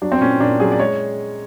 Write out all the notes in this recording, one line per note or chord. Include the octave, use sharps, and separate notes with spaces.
F#3 D4
C4
A#2 C#4
A#2 D4
F#3 G#4
D5
G#3 C#5